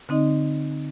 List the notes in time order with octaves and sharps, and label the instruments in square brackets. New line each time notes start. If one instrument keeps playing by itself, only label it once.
[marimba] D3 C4 D#4 D#5